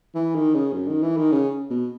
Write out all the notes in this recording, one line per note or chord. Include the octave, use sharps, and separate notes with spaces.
E3
D#3
C#3
F#2
D#3
E3
D#3
C#3
B2